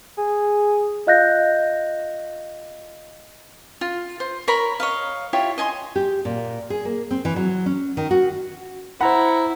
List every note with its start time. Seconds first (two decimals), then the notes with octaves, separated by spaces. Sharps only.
0.18 G#4
1.07 F4 D#5 F5 F#6 G6 A#6
3.81 F4
4.20 C5
4.48 A#4 C#5 A#5 B5
4.80 C#5 D#5 F5
5.33 E4 F4 G4 C#5
5.58 D#5 G#5 A5 C6
5.96 G4
6.25 A#2
6.70 G#4
6.85 A#3
7.11 C4
7.25 E3
7.36 F#3
7.66 C#4
7.97 D#3
8.11 F#4
9.01 E4 C5 F#5 A#5 B5